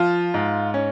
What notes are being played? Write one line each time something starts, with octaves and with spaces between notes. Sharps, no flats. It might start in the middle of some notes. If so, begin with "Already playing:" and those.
Already playing: F3 F4
G#2
C#4